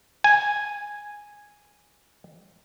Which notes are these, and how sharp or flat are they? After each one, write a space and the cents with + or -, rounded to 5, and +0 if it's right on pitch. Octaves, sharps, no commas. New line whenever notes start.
G#5 -5